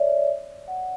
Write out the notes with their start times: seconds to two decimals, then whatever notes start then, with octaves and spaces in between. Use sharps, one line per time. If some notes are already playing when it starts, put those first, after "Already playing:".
Already playing: C#5 D5 E5
0.68 F#5